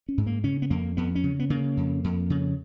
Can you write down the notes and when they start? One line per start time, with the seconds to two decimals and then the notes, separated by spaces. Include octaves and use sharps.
0.09 C#4
0.18 G#2
0.26 A#3
0.44 C#3 C#4
0.62 B3
0.70 F2 A#3
0.97 F2 B3
1.15 C#4
1.24 C#3
1.39 B3
1.50 C#3 A#3
1.77 F2
2.04 F2
2.30 C#3